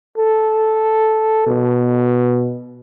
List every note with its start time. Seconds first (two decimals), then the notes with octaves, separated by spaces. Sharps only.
0.18 A4
1.47 B2